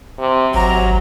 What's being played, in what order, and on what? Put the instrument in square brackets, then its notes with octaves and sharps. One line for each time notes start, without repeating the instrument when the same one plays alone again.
[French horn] C3
[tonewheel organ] G#1 [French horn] F#3 [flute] A#5